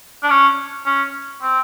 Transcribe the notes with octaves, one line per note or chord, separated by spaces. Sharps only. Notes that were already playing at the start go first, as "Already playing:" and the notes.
D4
C#4
C#4
C4